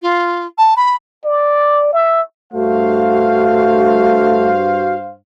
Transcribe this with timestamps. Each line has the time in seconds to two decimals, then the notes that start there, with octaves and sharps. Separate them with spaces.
0.02 F4
0.58 A5
0.76 B5
1.25 D5
1.93 E5
2.53 G2 A3 F#4 C5 F5